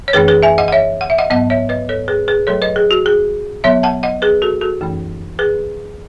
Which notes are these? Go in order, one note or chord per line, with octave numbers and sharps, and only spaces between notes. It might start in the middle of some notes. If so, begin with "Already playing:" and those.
C#5
F#2 E3 A3 C#4 G#4 B4
G#4 B4
E5 G#5
D#5 F#5
F#5
C#5 E5
F#5
E5
D#5 F#5
G#2 F#3 B3 D#5 F#5
C#5 E5
B4 D#5
A4 C#5
G#4 B4
G#4 B4
B2 F#3 A3 A4 C#5
B4 D#5
G#4
F#4
G#4
B2 F#3 B3 C#5 E5
F#5 A5
D#5 F#5
G#4 B4
F#4 A4
F#4 A4
F#2 E3 A3 C#4
G#4 B4